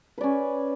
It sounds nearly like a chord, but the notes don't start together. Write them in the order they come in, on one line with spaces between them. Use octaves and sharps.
B4 D5 C#4